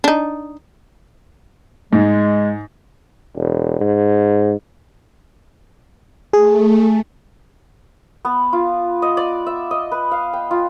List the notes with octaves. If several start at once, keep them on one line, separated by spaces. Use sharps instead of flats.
D4 D#4
G#2 G#3
E1
G#2
A3 G#4
B3
F4
D#5
D5
E5
D#5
B4
F5
G5
F4